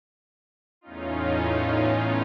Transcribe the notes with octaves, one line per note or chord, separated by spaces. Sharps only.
E2 A2 C#4 D#4 F4